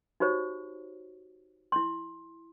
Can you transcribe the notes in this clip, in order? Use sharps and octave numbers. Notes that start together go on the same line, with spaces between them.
D#4 F#4 G4 C5 C#5
E4 C6